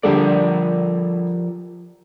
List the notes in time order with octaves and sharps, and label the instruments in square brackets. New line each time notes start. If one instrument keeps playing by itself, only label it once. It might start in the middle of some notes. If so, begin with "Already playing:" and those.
[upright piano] D3 G3 A4 [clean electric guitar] F3 A#4 D5